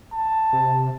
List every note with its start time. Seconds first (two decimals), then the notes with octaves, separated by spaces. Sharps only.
0.13 A5
0.53 C3